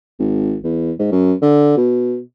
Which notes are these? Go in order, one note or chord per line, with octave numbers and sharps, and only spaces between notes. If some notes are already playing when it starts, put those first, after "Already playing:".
G#1
E2
G#2
F#2
D3
B2